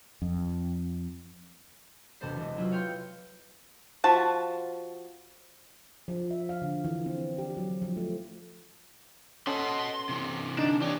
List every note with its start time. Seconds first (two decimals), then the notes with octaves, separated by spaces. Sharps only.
0.22 F2
2.21 E1 C3 B3 A4 C5 C7
2.36 E3 G#3
2.57 F#3 E4 F4
2.70 G#4 C#5 F5 G5 C6
4.04 F3 F#4 A5 B5
6.08 F3
6.31 E5
6.49 F5
6.62 D3
6.85 E3
7.06 C4
7.38 G4
7.57 F#3
7.82 F3
7.97 A3
9.47 C#4 A4 B4 D#5 F#5 C6
10.09 C3 E3
10.58 D3 D4 D#4
10.82 E3 D4 G4 C#5